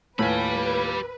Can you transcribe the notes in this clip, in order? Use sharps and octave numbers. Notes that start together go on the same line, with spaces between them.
D#2 A2 F4 G4 B4 G#5 B5